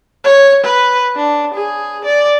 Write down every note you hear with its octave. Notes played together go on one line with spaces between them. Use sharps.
C#5
B4
D4
G#4
D5